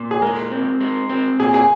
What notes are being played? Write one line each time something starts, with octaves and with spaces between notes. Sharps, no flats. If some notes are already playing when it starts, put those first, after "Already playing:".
Already playing: A#2
G#4
G#3 A#4
C4
G#3
C4
A#2 G#4
G#4